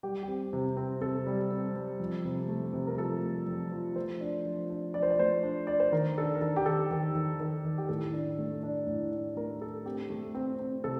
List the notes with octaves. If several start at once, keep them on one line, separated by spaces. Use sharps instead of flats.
G3 G4
G4
C4
C3
C4
C3 A4
G3
C4
G3
F2
C3
A3
C3
A#4
F3 A4
A3
F2
F3
A3 C5
D4
F3
D4
F3 D5
C5
D5
A3 C5
D4
D4 D5
C5
D#3 A#4
D4 A4
A#4
D#3 A4
G4
D#3 A4
D#3 G4
D#3
D#3 A4
D#3
G4
A2 A4
D4
A3
D4
A2
D4
A3 A#4
D4 A4
C4 G4
A3
C4
C4
C3 A4